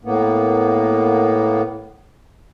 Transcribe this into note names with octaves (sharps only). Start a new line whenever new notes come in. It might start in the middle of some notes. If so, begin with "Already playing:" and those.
A2 A#3 B3